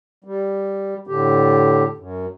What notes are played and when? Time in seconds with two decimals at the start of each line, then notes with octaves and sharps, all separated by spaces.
0.24 G3
1.07 A2 D3 G4
1.98 F#2